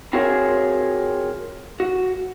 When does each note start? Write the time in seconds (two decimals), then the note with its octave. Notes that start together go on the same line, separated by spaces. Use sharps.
0.13 C4 F4 F#4 G#4 A#4 C#5
1.80 F#4